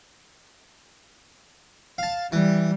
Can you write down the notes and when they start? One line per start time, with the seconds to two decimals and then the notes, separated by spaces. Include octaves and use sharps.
1.98 F5 A5
2.32 E3 G3